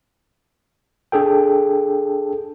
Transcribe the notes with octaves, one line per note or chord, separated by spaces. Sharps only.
D4 G#4 A4 G5